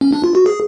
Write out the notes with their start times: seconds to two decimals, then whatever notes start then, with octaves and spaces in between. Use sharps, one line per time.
0.01 C#4
0.13 D4
0.24 F4
0.35 F#4
0.46 G#4